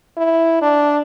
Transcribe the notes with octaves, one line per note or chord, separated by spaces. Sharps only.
E4
D4